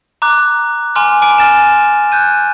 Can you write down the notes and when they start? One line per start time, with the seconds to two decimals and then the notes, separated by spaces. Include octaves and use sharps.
0.22 A#5 D6 F#6
0.96 G#5 A#5 C6 D6 F6
1.22 G#5 D6 D7 D#7
1.38 F6 A6 E7
2.12 F#6 G6 D#7